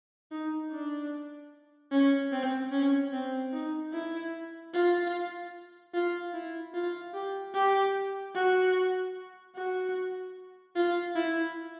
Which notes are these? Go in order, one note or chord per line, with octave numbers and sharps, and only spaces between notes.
D#4
D4
C#4
C4
C#4
C4
D#4
E4
F4
F4
E4
F4
G4
G4
F#4
F#4
F4
E4